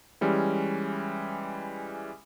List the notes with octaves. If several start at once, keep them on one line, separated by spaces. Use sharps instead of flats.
E3 G3 G#3 C#4